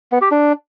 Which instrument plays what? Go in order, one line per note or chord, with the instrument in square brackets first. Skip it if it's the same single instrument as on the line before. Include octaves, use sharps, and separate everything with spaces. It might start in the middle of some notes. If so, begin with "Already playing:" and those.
[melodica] B3
G4
D4